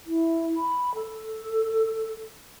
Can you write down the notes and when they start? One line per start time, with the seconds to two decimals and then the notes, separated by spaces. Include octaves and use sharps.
0.06 E4
0.56 B5
0.94 A4